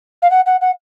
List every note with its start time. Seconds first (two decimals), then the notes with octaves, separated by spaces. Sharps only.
0.22 F5
0.31 F#5
0.46 F#5
0.61 F#5